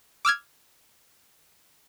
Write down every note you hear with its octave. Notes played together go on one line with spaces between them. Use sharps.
D6 E6 F6 G#6